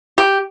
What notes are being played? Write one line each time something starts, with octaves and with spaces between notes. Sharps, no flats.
G4